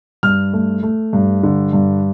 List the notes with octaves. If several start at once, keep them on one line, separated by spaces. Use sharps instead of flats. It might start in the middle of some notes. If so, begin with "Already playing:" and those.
G2 F6
A3
A3
G2
D3
G2